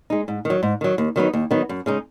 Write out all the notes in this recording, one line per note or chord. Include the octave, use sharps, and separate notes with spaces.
G#3 D#4
G#2
D#3 F#3
G#2
D#3 F#3
D#2
D#3 F#3 B3 D#4
D#2
D#3 F#3 B3 D#4
F#2
C#3 G#3 D#4